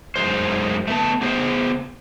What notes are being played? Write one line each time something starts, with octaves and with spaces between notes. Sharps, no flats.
F#2 E3 G#3 C5
A3 B3 A5
B3 G#4 C5